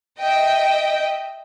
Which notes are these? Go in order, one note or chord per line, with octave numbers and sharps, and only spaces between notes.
D#5 E5 G5